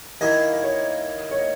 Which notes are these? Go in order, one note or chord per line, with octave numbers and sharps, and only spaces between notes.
D#3 A#3 E4 G#4 D#5
D#5
C#5
C#5
D#5